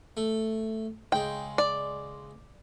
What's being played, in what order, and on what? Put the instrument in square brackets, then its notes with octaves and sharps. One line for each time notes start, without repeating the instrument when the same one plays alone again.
[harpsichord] A3
[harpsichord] C#2 G#3 [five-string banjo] G5
[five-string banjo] D5